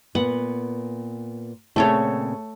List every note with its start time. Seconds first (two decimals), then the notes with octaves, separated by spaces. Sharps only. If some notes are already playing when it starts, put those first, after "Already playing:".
0.15 A#2 B3 F#5
1.76 A#2 C#3 A3 C4 A4 C#5